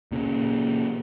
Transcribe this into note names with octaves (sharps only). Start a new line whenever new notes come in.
A#2 C#3